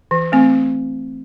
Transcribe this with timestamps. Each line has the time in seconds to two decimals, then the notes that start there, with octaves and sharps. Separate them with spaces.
0.11 E3
0.32 A3 C4